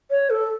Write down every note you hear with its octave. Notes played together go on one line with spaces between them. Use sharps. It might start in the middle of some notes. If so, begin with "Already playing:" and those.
C#5
A4